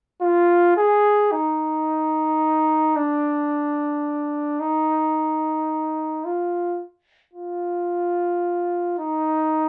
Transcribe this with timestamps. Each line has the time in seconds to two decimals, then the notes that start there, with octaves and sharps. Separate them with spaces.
0.21 F4
0.77 G#4
1.32 D#4
2.96 D4
4.60 D#4
6.25 F4
7.33 F4
8.99 D#4